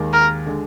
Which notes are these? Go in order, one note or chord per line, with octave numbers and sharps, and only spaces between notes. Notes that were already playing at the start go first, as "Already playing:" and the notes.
Already playing: D#2 D#3 G#3
A#4
D3 G#3